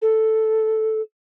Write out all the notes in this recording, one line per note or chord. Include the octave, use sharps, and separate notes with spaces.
A4